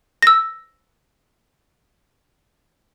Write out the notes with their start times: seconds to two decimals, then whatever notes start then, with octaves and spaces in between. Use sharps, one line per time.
0.22 E6 A#6